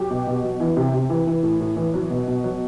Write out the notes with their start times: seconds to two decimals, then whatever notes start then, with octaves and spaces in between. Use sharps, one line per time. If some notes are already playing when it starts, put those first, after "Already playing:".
Already playing: F#3 G4
0.10 B2
0.27 B2
0.43 F#3
0.60 E3
0.77 C3
0.94 C3
1.10 E3
1.27 E3
1.43 A2
1.60 A2
1.76 E3
1.94 F#3
2.10 B2
2.28 B2
2.44 F#3